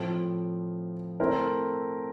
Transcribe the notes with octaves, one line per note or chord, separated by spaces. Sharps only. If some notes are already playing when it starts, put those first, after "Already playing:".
Already playing: A2 F3 C4
A3 C4 E4 A#4